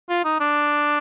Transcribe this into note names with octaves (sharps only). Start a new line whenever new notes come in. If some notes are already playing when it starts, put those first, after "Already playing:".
F4
D#4
D4